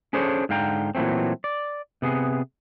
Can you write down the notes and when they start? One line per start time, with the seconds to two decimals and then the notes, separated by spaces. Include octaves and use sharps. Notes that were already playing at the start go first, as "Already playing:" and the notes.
0.13 C#4 D4 G#4 A4 C5 C#5
0.49 G#2 D3 F5 G5 A#5
0.95 A#2 E3 F#3 A3 C4
1.44 D5
2.02 C3 B3 G#4